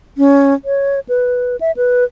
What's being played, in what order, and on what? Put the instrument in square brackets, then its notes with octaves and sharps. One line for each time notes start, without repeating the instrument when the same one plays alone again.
[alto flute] C#4
C#5
B4
E5
B4